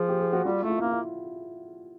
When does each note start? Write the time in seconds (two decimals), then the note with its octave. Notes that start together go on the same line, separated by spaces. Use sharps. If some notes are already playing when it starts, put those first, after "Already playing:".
Already playing: F3 G#4
0.09 G4
0.20 G#4
0.33 F#4
0.44 G3 F4
0.63 A3 E4
0.70 F4
0.78 E4
0.81 A#3 F4
0.92 E4